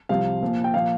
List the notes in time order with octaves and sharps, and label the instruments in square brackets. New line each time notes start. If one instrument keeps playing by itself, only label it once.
[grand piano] C2 C3 F3 F5
A#1 A#2 F3
G5
A#2 F3 F5